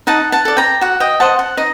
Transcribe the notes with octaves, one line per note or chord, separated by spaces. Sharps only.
D#4 F#5 A5
F#5 A5
A4 D5
G5 A#5
F#4 F#5
D#5 G5
C5 D#5 F#5 A5
F#5
D#4 D#5